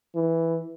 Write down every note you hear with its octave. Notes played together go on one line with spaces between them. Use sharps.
E3